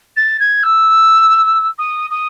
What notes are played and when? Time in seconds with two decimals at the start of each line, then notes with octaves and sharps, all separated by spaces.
0.16 A6
0.39 G#6
0.63 E6
1.78 D#6
2.10 D#6